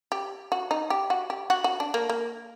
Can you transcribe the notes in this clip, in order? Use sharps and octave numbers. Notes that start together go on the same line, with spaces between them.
G4
F#4
D#4
G4
F#4
G4
F#4
F#4
D4
A#3
A#3